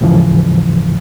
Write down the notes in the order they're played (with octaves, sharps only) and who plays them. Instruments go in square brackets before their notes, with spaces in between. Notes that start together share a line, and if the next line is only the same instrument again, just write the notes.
[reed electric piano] D#2 G#2 C#3 E3 F3